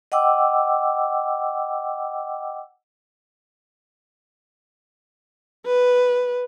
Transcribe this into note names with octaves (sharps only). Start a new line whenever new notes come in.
D#5 F#5 G5 D6 E6
B4